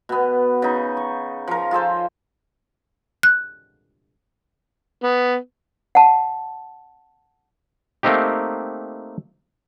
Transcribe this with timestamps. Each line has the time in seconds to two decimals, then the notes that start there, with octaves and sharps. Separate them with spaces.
0.09 B2 B3
0.62 C#3 D#4
0.97 C#6
1.48 F3 A#4
1.71 F4 G#4 A4 C5
3.23 F#6
5.03 B3
5.95 F#5 A5
8.03 A3 A#3 C4 D#4 G4